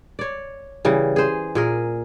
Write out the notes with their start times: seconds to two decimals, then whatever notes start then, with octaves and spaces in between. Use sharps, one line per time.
0.19 C#5 D5
0.85 C#3 E3 G3
1.16 G#4 C5
1.55 A#2 G#4 A#4